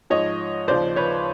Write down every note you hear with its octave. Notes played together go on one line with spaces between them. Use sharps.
G#2 F3 C#5 D#5
D#2 C#3 F3 C5 D5
B4 C#5